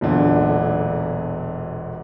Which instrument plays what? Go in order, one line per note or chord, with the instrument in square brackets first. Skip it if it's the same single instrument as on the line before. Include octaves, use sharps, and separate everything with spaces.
[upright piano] E1 B1 A#2 D3